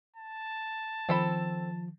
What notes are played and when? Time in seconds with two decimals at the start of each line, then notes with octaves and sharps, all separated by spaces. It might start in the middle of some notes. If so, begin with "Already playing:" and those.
0.16 A5
1.09 D#3 F3 C4 A4 B5